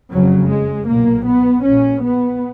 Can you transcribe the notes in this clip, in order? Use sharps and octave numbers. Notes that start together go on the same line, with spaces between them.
F#1 F2 C#3 F#3
G#3
B1 A#2 A#3
B3
A#1 A#2 C#4
B3